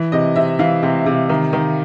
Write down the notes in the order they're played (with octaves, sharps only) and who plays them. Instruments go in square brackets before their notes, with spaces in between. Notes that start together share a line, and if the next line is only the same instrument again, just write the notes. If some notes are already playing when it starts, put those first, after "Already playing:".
Already playing: [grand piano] E3
C3 D#5
C3 E5
E3 F5
C3
C3
D#3
D#3